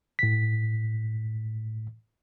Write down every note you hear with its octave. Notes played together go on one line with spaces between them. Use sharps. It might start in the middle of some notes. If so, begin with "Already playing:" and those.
A2 B6